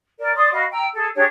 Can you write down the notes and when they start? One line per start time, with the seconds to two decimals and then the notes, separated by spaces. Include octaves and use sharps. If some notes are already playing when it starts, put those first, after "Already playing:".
0.19 A#4 D5
0.35 D5 C6 D#6
0.52 F#4 D#5 F5 B5
0.71 G5 A#5 E6
0.93 G#4 A4
1.15 D4 G4 G#4 C#5